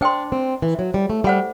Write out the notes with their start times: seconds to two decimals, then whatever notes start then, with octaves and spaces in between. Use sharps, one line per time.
0.01 D4 C5 G5 C6
0.32 C4
0.62 E3
0.79 F#3
0.94 G3
1.10 A3
1.24 G3 C5 F#5 B5